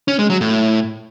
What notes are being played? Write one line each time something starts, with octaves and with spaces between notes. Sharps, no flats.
C#4
G#3
F#3
A2